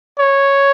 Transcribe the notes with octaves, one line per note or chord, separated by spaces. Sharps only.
C#5